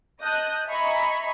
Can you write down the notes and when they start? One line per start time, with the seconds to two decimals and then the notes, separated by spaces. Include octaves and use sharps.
0.21 D#5 A5 D#6 F#6 G6
0.68 D#5 E5 G#5 A#5 B5 C#6